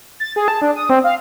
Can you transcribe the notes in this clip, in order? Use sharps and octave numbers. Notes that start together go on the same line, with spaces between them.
A6
G#4
A5
D4
D#6
C4
F5